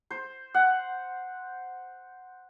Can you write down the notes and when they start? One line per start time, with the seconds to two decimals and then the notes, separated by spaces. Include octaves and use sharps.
0.11 C5
0.54 F#5